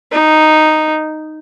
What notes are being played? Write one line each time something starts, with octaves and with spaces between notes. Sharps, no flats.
D#4